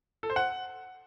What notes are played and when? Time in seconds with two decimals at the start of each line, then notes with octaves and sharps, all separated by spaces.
0.23 A4
0.30 C5
0.36 F#5